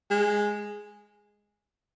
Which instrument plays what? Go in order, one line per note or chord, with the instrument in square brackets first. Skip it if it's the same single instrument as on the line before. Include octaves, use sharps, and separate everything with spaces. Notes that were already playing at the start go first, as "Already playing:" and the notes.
[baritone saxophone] G#3